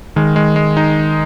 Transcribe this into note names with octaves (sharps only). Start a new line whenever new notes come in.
D#3 G#3
G#3
G#3
D#4